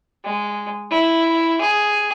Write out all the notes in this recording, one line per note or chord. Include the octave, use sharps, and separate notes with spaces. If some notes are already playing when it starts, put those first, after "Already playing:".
G#3
E4
G#4